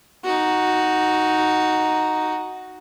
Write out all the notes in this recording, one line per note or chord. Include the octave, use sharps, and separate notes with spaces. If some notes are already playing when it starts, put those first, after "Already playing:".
D#4 F#4